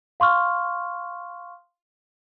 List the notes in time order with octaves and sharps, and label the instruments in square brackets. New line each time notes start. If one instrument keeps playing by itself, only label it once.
[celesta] F5 C6 C#6 F6